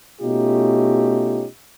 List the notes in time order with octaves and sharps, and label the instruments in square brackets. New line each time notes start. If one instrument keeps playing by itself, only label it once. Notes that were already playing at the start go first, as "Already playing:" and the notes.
[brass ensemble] B2 A3 C#4 D#4 F4 G4